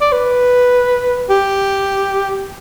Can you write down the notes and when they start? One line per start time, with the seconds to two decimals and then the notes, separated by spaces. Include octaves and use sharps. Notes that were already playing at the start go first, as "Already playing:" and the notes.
0.01 D5
0.12 B4
1.30 G4